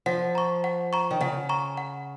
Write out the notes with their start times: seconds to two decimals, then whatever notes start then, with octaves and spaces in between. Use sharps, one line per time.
0.06 F3 F#5
0.35 A#5 C#6
0.64 F#5
0.93 A#5 C#6
1.11 D#3
1.20 C#3 F#5
1.49 A#5 C#6
1.77 F#5